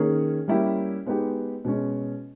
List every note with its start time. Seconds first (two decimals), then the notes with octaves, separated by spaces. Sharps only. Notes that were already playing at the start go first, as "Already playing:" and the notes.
Already playing: D#3 A#3 C#4 G#4 C#5
0.48 G3 A#3 C#4 E4 G4
1.06 G#3 B3 D#4 G4
1.65 B2 G#3 C#4